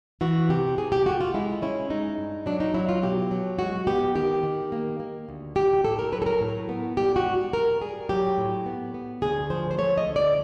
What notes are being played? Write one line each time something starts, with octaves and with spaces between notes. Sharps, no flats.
E3 F#4
C3 G4
C3 G#4
G4
A3 F#4
F4
G#3 E4
C#4 E4
G#3 D#4
G2
F#3 D4
D#4
F#3 E4
F4
B2 G4
F#3
G#3 F#4
B3 G4
D#3 G4
D#3
A#3
A#3
D2
D2 G4
A2 A4
A#4
F#3 B4
A4
A#4
A2
B3
G3 G4
F#4
G#2
G3 A#4
G3 G#4
F#3 G4
A2
B3
B3
D2 G#4
F3 C5
C5
A3 C#5
D#5
D2
D5